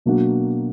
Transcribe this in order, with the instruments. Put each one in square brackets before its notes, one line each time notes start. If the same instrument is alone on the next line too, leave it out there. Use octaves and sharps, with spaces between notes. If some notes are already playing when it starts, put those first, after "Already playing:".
[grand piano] B2 F#3 A#3 D4 F#4